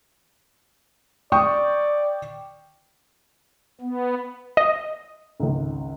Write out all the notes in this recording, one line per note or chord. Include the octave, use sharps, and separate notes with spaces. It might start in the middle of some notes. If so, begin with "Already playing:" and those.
D5 G5 C#6 D#6
B3
D#5
G#1 C#2